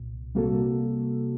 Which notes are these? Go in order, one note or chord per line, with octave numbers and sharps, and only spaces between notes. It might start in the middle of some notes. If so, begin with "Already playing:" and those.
Already playing: C2 A#2
C3 G3 A#3 F#4 A4